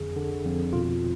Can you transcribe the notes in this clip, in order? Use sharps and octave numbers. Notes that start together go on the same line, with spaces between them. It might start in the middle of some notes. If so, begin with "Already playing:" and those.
Already playing: F2 D3 G#4
D3
F2
B2 F4